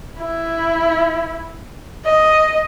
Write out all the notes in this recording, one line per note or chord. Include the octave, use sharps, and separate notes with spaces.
E4
D#5